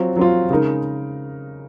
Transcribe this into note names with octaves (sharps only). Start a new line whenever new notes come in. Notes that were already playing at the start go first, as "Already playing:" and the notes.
Already playing: F#3 C4 F4
F#3 C4 F4
C#3 G#3 D#4 A#4